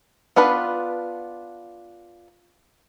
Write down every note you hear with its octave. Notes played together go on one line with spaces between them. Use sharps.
B3 D4 F4 B4